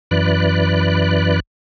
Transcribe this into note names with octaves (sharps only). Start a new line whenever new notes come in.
F#2 E3 D5 B5 F#6